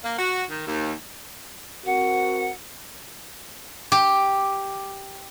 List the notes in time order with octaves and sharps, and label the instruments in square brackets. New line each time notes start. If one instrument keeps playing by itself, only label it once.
[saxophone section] A#3
F#4
D#3
D#2
[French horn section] C4 A#4 [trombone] F#4 [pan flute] F#5
[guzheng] G4